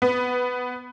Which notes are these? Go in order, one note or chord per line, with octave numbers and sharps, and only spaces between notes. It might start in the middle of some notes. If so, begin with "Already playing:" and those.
B3